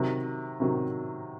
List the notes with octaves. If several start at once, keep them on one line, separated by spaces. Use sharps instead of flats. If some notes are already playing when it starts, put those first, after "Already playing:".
Already playing: C3 D#3 F#3
C3 D#3 F#3